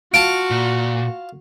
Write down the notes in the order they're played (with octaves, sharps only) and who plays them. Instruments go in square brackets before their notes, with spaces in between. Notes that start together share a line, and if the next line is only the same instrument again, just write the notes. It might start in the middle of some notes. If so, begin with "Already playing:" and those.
[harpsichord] F4 A5 [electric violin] F#4 [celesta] D7
[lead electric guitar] A#2